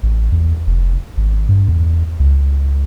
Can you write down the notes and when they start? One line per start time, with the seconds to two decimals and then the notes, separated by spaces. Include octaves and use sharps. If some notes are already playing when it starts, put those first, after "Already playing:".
0.03 A1
0.32 E2
0.67 F1
1.17 G#1
1.48 G2
1.68 E2
2.20 C#2